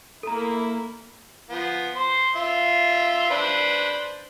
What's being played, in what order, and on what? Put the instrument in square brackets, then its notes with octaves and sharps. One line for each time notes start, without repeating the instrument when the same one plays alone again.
[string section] A#3 E4 [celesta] A4 A#5
[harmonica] F3 B3
C5 C6
F4 E5
D4 B4 C5